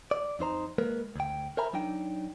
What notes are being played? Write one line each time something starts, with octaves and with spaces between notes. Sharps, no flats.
D5
F2 D#4 C5 A#5
G#3 A#3 A#4 B4
D2 G5
A#4 C5 E5 G#5 A#5 B5
F#3 D4 D#4 G5